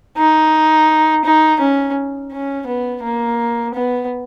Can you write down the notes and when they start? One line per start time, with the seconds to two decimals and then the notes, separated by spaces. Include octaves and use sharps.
0.18 D#4
1.25 D#4
1.60 C#4
2.32 C#4
2.67 B3
3.03 A#3
3.74 B3